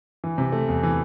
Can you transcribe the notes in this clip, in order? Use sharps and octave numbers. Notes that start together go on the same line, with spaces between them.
E3
C3
A3
E2
E3